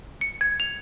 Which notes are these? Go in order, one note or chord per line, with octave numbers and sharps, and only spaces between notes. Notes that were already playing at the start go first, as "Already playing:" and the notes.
C#7
G#6
F7